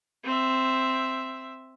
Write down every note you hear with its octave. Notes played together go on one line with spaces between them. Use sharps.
C4 E5